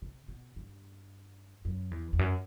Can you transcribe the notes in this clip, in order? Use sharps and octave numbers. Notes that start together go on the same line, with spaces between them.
C3
B2
G2
F#2
E2
E2
F#2